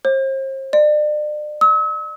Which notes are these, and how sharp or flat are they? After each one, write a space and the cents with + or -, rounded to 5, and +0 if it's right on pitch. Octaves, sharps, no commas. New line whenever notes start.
C5 +40
D5 +35
E6 -40